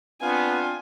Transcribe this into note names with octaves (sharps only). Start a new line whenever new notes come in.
B3 C4 D4 F4 G#5